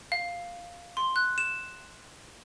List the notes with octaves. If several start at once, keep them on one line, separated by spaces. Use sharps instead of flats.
F5
C6
F#6
E7